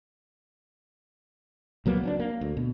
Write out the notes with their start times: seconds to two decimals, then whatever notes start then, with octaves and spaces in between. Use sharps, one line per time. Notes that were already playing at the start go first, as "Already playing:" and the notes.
1.86 C#2 F#3 A#3 B3
2.03 F#3 C#4 D4
2.20 A#3
2.41 D2
2.57 B2